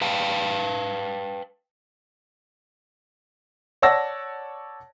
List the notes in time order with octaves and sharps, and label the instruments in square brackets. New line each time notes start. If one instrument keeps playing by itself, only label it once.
[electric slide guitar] B4 F5 G5 A5
[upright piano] C#5 D5 F#5 A5 E6 A#6